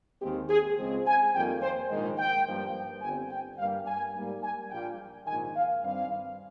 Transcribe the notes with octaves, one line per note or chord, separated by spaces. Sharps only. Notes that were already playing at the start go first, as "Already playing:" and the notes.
D#2 D#3 G#3 C4 G4
G#4
C#2 C#3 F3 G#3 C4
G#5
F2 D#3 G3 A#3 G5
C5
A#1 G#2 D#3 G#3
G5
G2 F3 A#3
G1 G2 G3 C4 G#5
G5
G2 G3 A#3 F5
G#5
G#2 G3 A#3
G#5
A#1 A#2 G3 A#3 G5
A#1 G#2 D#3 G#5
F5
G2 D#3 G3 C4 F5